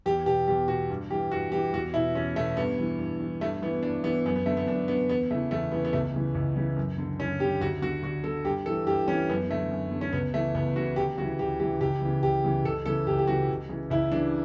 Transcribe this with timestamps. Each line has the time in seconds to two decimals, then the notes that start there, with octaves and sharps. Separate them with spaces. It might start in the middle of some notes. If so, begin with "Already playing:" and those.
0.06 E2 G4
0.26 B2 G4
0.48 E2 G4
0.68 B2 F#4
0.90 G2
1.10 E3 G4
1.31 G2 F#4
1.52 E3 G4
1.73 E2 F#4
1.94 B2 E4
2.15 E2 C#4
2.36 B2 A3
2.57 G2 B3
2.79 E3
2.99 G2
3.20 E3
3.41 G2 A3
3.62 E3 B3
3.83 G2 D4
4.04 E3 B3
4.25 F#2 B3
4.36 B3
4.46 D3 A3
4.57 B3
4.67 F#2 D4
4.88 D3 B3
5.09 E2 B3
5.30 C#3 E3 A3
5.51 E2 A3
5.71 C#3 E3 B3
5.85 B3
5.93 C#2 A3
6.14 C#3 E3
6.35 C#2
6.56 C#3 E3
6.77 F#2
6.98 D3
7.19 F#2 C#4
7.39 D3 G4
7.61 D2 F#4
7.82 D3 F#4
8.02 D2 F#4
8.24 D3 A4
8.45 G2 G4
8.66 E3 A4
8.87 G2 G4
9.08 E3 C#4
9.29 F#2 B3
9.50 D3 A3
9.71 F#2
9.91 D3
10.01 C#4
10.13 C#2 B3
10.34 C#3 E3 A3
10.54 C#2 B3
10.76 C#3 E3 F#4
10.96 D2 G4
11.18 C#3 F#4
11.22 E3
11.39 D2 G4
11.60 C#3 E3 G4
11.81 C#2 G4
12.01 C#3 E3
12.23 C#2 G4
12.44 C#3 E3
12.64 C#2 A4
12.86 C#3 E3 A4
13.07 C#2 G4
13.19 G4
13.27 C#3 E3 F#4
13.49 C#2
13.69 C#3 E3
13.90 C#2 E4
14.12 C#3 E3 D4